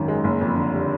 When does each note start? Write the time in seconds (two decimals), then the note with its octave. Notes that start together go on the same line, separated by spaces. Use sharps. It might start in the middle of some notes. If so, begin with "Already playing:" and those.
Already playing: G#1 F#2 D#3
0.08 G#3
0.24 F#1
0.41 F2
0.56 D3
0.74 G3